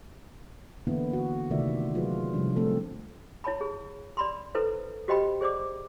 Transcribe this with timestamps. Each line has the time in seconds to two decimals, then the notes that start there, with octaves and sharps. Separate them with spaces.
0.87 D3 E3 A#3 B3 D4 E4
1.13 F#4
1.51 C3 D#3 A3 F4 D5 E5
1.95 F#3 F4 G#4 B4
2.33 C3 F3 G3 D4
2.56 A3 C4 D4 A4
3.44 E4 C#5 A5 B5
3.61 G#4
4.17 D5 B5 C6
4.55 E4 A4 B4 C5
5.08 F#4 G4 C5 D#5 G5 B5
5.41 G#4 C5 D5 D6